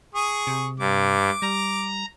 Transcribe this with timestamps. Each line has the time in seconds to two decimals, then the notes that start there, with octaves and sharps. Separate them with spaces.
0.15 G#4 C#6 D#6
0.47 C3
0.79 G2 D6
1.42 G3 A#5